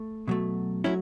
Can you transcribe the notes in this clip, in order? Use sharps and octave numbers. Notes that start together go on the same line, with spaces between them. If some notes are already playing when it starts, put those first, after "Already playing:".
Already playing: A3
B2 F#3 A3
F#3 A3 C#4 E4